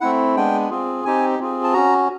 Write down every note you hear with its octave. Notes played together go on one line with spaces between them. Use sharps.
A3 C4 E4 F#5
G#3 B3 D4 G5
C4 F4 G#4
C4 D#4 G4 G#5
C4 F4 G#4
A5
C#4 F#4 A#5